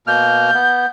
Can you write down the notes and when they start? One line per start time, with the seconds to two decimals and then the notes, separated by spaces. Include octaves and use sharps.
0.07 B2 A#3 F6 G6
0.54 B3